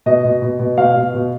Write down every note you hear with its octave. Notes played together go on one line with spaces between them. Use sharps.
B2 D#5
B2
B2
B2
B2 F5
B2
B2